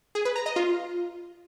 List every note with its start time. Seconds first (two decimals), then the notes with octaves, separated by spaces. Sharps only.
0.15 G#4
0.25 B4
0.36 A#5
0.46 D#5
0.56 F4